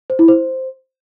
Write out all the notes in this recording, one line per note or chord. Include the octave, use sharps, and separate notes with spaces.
C5
E4
C5